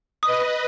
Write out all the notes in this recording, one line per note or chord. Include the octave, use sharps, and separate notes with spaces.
B4 D#5 D#6